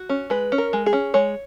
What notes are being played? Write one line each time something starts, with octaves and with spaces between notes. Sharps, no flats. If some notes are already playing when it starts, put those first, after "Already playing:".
Already playing: F#4
C#4
G#3 B4
C#4
A#4
G#3
G#4
C#4
G#3 C#5